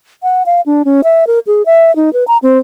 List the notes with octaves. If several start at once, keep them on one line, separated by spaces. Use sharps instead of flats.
F#5
F5
D4
C#4
E5
A#4
G#4
E5
D#4
B4
A#5
C4